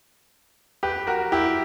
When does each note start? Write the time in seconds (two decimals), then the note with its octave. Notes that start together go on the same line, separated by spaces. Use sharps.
0.83 G4 B4
1.07 F#4 A#4
1.32 E4 G4